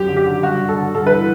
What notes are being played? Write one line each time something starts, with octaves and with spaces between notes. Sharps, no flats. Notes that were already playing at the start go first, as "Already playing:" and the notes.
Already playing: F#2 G4
D3
G4
D3
G2 F#4
D3
A4
D3
G2 A4
E3 B4